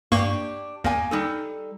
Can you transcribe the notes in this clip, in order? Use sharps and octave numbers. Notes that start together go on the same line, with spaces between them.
G2 A#3 D4 G4 C#6
E2 A#3 G#5
G3 D#4 A4